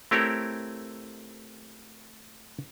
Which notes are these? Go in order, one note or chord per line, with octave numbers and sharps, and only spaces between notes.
A3 C4 E4 G4 A#4 C#5